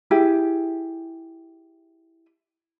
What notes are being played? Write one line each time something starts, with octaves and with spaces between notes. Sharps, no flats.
E4 G4 G#4